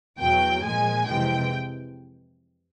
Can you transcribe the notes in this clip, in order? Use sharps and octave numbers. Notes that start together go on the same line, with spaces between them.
E2 B2 F#3 G5
A#2 F3 G#3 G#5
F2 C3 E3 G#3 G5